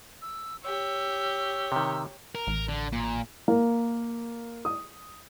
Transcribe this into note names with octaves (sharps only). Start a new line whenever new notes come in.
E6
G4 C#5 E6
C3 D#3
A#4
A1
D3
A#2
A#3
D#6